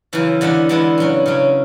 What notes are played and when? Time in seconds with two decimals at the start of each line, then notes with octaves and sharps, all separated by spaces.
0.13 F#2 C#3 E3
0.41 E2 D3 G#3 B3 E4
0.69 E2 D3 G#3 B3 E4
0.98 C#3 F#3 C#4
1.26 C#3 F#3 C#4